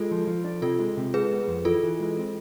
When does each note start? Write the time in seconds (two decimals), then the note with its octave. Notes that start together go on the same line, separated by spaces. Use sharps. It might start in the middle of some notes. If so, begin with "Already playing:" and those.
Already playing: G#3 F4 A4
0.11 F3
0.27 F3
0.44 D4
0.62 C3 F4 A4
0.79 G#3
0.97 C3
1.14 G#3 G#4 B4
1.31 B3
1.48 F2
1.65 E3 F4 A4
1.83 E3
2.00 G#3
2.17 C4